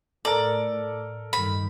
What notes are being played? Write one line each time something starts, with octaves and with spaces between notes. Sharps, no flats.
A2 A4 A#4 D5
G2 D#3 B5